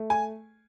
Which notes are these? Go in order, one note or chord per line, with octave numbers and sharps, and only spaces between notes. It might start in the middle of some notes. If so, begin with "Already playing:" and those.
Already playing: A3
G#5